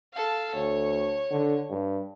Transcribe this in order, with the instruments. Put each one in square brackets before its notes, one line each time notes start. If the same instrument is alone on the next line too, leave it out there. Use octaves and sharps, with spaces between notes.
[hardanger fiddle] A4 F5
[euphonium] D2 [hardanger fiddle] C#5
[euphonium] D3
G2